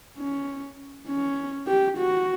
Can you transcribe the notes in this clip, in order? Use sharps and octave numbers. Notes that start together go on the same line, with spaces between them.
C#4
C#4
G4
F#4